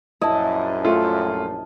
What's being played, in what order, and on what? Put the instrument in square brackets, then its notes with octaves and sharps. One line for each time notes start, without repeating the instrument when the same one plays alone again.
[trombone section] A#1 F#2 [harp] E4 [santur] D#5 A5
[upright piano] A3 F4